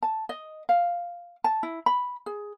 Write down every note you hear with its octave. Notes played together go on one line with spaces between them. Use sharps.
A5
D#5
F5
A5
E4
B5
G#4